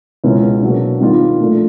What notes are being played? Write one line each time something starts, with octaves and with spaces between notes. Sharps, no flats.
C#2 B2 G#3 C#4 E4
B2 F#3 A#3 D4
D#3 G3 C4 F4
A#2 F3 A3 D4 F4